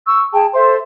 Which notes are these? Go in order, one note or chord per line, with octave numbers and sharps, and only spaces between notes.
C#6 E6
G#4 G5 A5
A4 C5 E5 C6